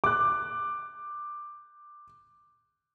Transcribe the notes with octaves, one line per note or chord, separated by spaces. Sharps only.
D6 F#6